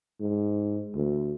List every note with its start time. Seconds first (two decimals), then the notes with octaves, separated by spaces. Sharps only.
0.20 G#2
0.95 D2